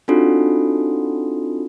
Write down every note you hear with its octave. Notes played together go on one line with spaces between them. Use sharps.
C4 D4 D#4 F4 F#4 A4